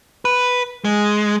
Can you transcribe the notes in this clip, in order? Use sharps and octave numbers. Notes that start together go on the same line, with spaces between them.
B4
G#3